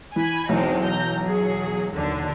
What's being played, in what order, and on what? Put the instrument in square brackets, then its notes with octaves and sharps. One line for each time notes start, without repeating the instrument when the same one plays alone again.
[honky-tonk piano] E3 [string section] G#5 B5 G#6
[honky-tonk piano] B1 E2 [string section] G#3 C4 D#4
[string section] A#5 G6
F#3 G#4
D#2 D3